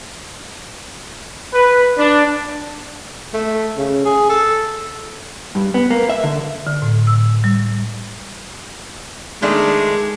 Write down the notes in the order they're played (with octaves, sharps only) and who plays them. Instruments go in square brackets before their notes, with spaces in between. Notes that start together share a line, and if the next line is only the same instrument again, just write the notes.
[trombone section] B4
D4
[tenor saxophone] A3
C#3
G#4
A4
[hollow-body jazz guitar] G2
B3
A#3
E5
D3
[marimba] D3
A2
E6
G3
[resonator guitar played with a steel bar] D#3 A3 D4 [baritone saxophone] G#3